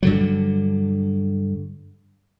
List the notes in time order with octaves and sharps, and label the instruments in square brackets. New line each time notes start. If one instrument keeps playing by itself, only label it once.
[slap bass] G2 D3 F#3